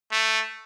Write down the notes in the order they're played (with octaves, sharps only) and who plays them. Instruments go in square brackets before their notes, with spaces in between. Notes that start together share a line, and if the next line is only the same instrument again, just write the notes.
[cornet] A3